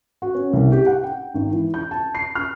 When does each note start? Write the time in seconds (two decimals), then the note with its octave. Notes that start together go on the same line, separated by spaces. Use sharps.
0.22 F#4
0.35 C#4
0.53 C2
0.72 G4
0.87 F#5
1.04 G5
1.34 G#1
1.52 E3
1.74 G6
1.91 A5
2.15 C7
2.35 F6